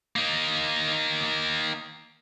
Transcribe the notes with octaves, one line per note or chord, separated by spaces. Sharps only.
A#3 D#4